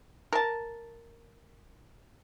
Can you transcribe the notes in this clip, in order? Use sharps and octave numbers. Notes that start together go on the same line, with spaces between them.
A#4 A5